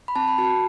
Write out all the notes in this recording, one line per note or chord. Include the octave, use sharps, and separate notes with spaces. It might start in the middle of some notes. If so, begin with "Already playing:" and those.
B5
C4 A5
B5
F#4 A5